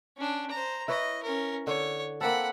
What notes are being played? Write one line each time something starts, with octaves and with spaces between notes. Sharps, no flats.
C#4 D4
C5 A#5
E4 B4 C#5 D#5
C#4 A#4
D3 C#5
A#3 C4 A4 F#5 B5